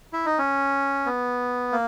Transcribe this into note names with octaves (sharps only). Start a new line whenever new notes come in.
E4
D#4
C#4
B3
A#3